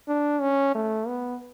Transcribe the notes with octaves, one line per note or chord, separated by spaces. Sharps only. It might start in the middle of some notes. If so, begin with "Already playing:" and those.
D4
C#4
A3
B3